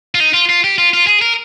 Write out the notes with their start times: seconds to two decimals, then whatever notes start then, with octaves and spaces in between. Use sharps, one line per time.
0.15 F4
0.20 D#4
0.34 F4
0.49 F4
0.64 G4
0.78 F4
0.93 F4
1.07 G#4
1.22 A#4